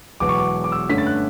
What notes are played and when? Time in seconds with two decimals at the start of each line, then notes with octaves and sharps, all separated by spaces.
0.20 E1 E2 B2 F#3 D6
0.29 C#6
0.38 D6
0.64 D6
0.72 E6
0.89 G2 D3 A3 C#4 B6
0.98 A6
1.06 F#6